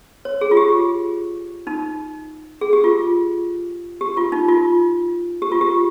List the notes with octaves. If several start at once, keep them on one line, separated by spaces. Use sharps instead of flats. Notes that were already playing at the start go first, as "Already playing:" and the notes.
C#5
G#4
F4
G4
D#4
G#4
G4
F4
G4
F4
D#4
F4
G4
F4
G4